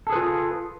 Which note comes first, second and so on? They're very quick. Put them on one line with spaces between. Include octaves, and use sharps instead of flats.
A4 G#4 B4 F4